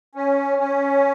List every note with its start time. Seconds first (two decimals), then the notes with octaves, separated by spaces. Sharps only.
0.15 C#4
0.58 C#4